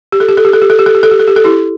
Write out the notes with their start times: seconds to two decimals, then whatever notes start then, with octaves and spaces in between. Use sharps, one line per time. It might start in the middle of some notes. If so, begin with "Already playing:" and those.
0.12 G4
0.20 A4
0.28 G4
0.37 A4
0.45 G4
0.53 A4
0.61 G4
0.70 A4
0.79 G4
0.86 A4
0.95 G4
1.03 A4
1.11 G4
1.19 A4
1.28 G4
1.36 A4
1.44 E4 G4